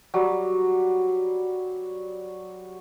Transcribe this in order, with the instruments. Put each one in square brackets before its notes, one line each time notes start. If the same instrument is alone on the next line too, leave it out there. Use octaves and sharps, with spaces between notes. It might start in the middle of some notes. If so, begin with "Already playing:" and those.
[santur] F#3 G3